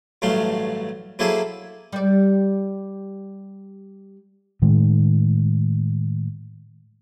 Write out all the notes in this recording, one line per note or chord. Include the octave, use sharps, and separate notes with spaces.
A1 G2 F#3 A3 F5 C6
F#3 A#3 E4 G#4 A4 C5
G3 D5
A2 D#3 G#3